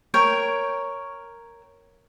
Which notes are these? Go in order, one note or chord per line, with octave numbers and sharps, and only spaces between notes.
A#4 C#5 G5